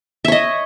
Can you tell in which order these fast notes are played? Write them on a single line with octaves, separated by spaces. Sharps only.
E5 C#5 D#5